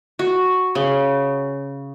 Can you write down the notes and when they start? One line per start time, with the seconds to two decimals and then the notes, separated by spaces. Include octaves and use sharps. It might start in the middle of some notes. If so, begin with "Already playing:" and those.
0.19 F#4
0.75 C#3